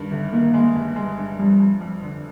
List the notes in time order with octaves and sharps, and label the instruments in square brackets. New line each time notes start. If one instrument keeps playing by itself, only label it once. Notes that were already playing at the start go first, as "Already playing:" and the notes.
Already playing: [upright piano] G2 D#3
[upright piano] G1 [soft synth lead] D3
[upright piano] D#3 [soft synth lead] A#3
[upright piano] G#3
G1
G#3
G2
[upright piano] F2 [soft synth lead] G3
[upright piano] F2
F2
D3